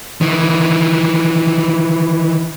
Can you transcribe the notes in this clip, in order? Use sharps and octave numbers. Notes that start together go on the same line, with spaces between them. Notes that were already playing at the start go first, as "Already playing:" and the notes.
D#3 E3